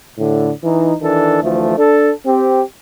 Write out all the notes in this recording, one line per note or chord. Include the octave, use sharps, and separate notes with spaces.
A2 D3
E3 D#4
D#3 E3 D4 A4
D2 E3 F3 A3
D4 A4
C4 G4